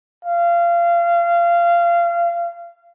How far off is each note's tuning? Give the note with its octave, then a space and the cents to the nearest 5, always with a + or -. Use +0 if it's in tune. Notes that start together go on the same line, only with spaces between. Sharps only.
F5 -25